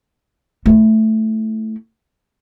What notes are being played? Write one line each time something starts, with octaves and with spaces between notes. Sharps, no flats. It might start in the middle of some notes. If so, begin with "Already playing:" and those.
A3 E4